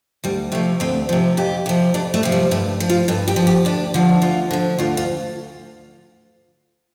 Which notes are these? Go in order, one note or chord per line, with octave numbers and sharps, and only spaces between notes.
D2 G3
C3 F3 A3
D2 C4
C3 F3
F2 G4
C3 F3
F2 D4
A3
C3 F3
G3
G2 A3
F3
F4
G2 A4
G4
F3
G4
D2 D4
D3 F3
D2 F4
D3 F3
D2 F4
F4